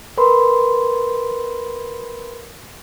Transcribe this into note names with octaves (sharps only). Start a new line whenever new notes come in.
A#4 B4 B5 C6